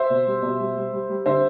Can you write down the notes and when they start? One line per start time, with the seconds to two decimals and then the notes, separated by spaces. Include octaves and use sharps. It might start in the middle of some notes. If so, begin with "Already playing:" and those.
Already playing: C5 E5
0.10 B2
0.27 G3
0.42 B2
0.59 G3
0.77 G3
0.93 G3
1.10 G3
1.26 D3 C5 E5